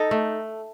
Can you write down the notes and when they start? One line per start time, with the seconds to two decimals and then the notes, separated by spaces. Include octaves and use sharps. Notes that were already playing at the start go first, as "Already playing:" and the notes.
Already playing: D#4 A4 D#5
0.11 A3